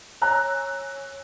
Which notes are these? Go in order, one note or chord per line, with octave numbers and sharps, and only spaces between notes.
C#5 G#5 A#5 E6 F#6